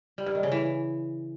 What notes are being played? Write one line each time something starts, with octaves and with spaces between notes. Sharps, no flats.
G3
G2
D#3
C#3
E3